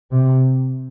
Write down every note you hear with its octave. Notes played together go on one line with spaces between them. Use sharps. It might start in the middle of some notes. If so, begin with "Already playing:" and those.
C3